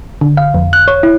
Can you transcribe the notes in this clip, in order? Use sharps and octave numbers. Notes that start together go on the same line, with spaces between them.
D3
F5
F2
F#6
C#5
E4